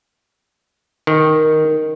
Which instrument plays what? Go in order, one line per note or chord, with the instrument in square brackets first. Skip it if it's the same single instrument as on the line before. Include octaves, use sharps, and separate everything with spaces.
[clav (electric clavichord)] D#3